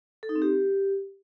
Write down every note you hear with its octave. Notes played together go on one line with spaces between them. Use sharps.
A4
D#4
C4
G4